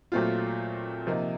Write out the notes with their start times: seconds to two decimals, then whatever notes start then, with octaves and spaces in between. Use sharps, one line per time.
0.12 A#2 F#3 A3 C4 F4
1.07 C3 F3 A#3 D#4